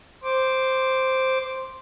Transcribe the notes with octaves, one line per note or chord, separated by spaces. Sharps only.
C5 D6